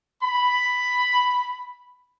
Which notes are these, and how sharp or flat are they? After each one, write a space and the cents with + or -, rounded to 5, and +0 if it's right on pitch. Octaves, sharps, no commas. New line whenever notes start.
B5 +5